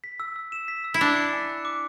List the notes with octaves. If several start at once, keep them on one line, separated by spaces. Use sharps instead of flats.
B6
E6
E6
E7
B6
E6
E4
D4 D6
C#7
G#5
F#6
D6